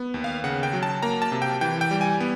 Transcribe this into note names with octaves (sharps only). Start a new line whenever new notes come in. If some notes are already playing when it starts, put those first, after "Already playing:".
Already playing: B3
D#2
F5
C#3 F#5
G5
F#3
A5
A#3 A#5
A5
C3
G5
E3 G5
G5
G3
G#5
B3